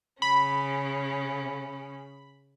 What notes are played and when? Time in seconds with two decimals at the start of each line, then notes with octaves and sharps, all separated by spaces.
0.22 C#3 C#4 B5